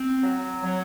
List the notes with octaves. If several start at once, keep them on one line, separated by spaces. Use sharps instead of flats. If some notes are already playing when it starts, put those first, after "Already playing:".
Already playing: C4
F#3
F#3